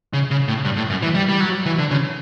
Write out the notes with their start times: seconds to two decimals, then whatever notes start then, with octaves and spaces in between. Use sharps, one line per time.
0.13 C#3
0.31 C#3
0.48 A2
0.65 G2
0.77 A2
0.90 F#2
1.02 E3
1.14 G3
1.29 G3
1.40 F#3
1.66 E3
1.78 D3
1.91 C#3